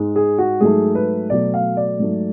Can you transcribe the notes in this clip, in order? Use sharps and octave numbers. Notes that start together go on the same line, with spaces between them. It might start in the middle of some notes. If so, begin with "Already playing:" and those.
Already playing: G#2 G#3
G#4
F#4
G#2 F#3 A3 G#4
B4
B2 F#3 A3 D5
F5
D5
G#2 F#3 A3